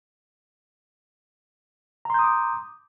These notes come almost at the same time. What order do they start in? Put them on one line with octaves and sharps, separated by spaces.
A#5 C6 G6 D#6 D6